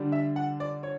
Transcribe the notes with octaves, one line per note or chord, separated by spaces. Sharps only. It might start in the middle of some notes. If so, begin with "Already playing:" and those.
Already playing: D3 G3 D4
E5
F#5
D5
C#5